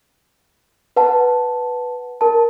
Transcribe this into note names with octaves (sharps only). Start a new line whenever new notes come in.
B4 F#5 A5
A#4 A5